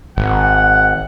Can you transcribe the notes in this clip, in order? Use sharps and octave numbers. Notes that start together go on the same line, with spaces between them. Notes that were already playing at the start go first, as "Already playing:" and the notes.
G#1 F#5